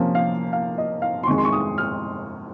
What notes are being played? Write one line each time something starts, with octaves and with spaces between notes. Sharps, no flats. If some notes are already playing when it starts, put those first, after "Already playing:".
Already playing: C3 F3 A#3 C#4
F5
F5
D#5
F5
C6
F2 D#3 G#3 C#6
C6
C#6
D#6
F6